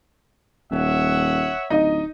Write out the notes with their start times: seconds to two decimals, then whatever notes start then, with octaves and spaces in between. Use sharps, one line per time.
0.71 D#1 C#5 E5 F#5
1.70 D1 D#4 D#5